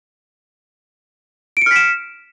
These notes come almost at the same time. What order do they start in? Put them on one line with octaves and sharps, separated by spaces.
D7 C#7 F6 B6 E7